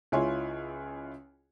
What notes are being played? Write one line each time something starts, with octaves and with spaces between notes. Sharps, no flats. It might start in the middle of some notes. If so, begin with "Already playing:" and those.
C#2 E4 F4 C#5 G#5 C6